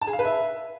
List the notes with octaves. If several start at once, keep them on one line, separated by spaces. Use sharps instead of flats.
A5
G#4
F5
B4
E5